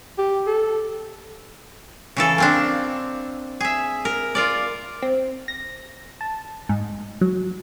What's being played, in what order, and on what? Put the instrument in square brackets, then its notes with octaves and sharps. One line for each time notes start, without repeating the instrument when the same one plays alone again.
[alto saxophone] G4
A4
[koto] C#3 E3 A4
A#3 C4 D4
G#4 E5
A#4
F4 A#4 D5
[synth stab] C4
A#6
A5
G#2
F#3